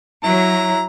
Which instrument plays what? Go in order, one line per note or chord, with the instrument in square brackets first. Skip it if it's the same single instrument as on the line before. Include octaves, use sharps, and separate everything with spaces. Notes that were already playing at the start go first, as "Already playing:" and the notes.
[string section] F#3 [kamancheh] E4 [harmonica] A#5